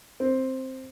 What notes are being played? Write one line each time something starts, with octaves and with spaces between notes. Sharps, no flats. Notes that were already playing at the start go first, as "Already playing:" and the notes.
C4